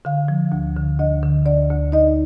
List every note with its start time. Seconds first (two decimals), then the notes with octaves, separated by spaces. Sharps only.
0.05 D3 F5
0.28 F3
0.52 D2
0.76 D3
0.99 D2 D#5
1.23 D3
1.45 D2 D5
1.70 D2
1.92 D#4 D#5